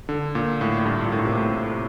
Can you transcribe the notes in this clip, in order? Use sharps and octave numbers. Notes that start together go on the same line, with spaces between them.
D3
A#2
A2
A2
G2
A#2
A2
A#2
C3
A2
C3
A2